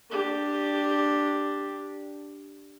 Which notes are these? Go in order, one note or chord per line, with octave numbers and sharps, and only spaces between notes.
D4 G4